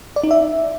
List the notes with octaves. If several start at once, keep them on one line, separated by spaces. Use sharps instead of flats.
D5
D#4
E5